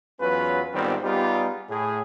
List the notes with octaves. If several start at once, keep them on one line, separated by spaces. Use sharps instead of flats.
E2 F#3 C#4 F4 B4
G#1 D#3 G3 B3 C4 F4
G3 B3 D#4 F4 G4 G#4
A2 G#4